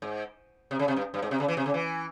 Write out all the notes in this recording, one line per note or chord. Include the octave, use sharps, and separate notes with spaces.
G#2
C3
C#3
C3
G2
G2
G#2
C3
C#3
E3
C3
C#3
E3